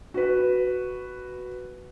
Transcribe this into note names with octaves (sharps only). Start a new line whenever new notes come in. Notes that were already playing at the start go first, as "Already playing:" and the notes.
F#4 B4